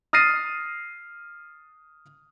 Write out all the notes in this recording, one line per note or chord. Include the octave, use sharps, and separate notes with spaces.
D#6 F6 A6 A#6 C7 D#7